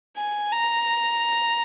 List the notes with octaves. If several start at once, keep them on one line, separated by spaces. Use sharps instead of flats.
G#5
A#5